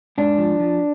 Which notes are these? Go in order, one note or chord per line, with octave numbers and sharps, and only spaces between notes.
G#2 D4
F3
F3